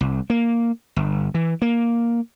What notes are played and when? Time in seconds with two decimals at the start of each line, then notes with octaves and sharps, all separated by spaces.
0.01 C2
0.30 A#3
0.96 G1
1.34 E3
1.62 A#3